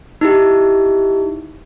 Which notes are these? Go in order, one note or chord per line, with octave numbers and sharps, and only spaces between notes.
D#4 E4 G4